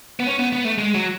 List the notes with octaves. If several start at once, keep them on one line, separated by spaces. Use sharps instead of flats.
B3
C#4
B3
B3
A3
G#3
F#3